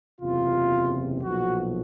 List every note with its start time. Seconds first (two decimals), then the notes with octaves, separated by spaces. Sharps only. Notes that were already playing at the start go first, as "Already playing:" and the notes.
0.21 F#1 E2 C3 F4
1.23 B1 A#2 F3 F#4